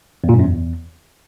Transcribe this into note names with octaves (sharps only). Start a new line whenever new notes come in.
E2
A#2
G2
F#2
E2